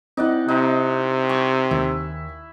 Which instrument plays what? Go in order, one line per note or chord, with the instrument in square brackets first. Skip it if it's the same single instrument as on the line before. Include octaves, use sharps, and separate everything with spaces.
[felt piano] C4 E4 [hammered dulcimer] D#4 D5 F#5
[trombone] C3 [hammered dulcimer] D#4
[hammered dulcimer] G#5 C#6
[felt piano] D#2 [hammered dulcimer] E4